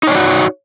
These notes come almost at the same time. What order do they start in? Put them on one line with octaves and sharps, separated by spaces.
D#4 C#5 D5 F#4